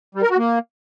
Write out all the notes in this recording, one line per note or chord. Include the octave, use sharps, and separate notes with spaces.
G3
A#4
F#4
A#3